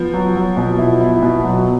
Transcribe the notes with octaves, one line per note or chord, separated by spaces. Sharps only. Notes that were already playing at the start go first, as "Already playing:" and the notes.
Already playing: F3 B3
F#3
F#3
B2
E4
E4
B2
F#3